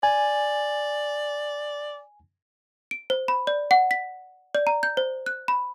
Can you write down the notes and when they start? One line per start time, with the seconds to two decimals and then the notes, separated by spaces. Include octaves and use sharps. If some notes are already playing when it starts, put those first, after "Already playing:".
0.03 D5 G#5
2.91 D7
3.10 C5
3.28 B5
3.47 D5
3.71 F#5
3.91 B6
4.55 D5
4.67 A#5
4.83 G6
4.97 C5
5.26 F#6
5.48 B5